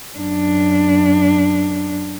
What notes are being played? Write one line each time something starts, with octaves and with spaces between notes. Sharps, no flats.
F#2 D4